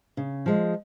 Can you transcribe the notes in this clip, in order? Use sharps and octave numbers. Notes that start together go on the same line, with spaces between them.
C#3
F3 G#3